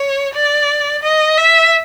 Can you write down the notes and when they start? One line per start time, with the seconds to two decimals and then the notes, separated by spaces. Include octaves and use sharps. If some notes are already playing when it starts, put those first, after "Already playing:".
Already playing: C#5
0.35 D5
1.04 D#5
1.38 E5